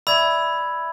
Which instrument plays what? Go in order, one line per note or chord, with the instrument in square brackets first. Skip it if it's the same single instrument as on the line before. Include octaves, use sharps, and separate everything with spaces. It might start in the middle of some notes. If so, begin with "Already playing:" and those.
[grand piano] D5 E5 [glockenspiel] B5 E6 G#6